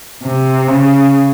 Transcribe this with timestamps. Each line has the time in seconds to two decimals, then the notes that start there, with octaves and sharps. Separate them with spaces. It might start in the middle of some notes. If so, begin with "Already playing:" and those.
0.23 C3
0.68 C#3